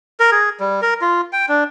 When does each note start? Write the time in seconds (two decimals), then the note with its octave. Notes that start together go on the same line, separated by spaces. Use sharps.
0.20 A#4
0.32 G#4
0.60 G3
0.82 A#4
1.02 F4
1.33 G5
1.49 D4